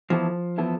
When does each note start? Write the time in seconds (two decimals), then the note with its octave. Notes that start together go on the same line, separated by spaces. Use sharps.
0.10 E3 F3 B3 E4 A4
0.58 E3 B3 E4 A4